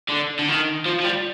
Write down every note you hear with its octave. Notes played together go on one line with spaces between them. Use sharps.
D3
D3
D#3
F3
F3
G3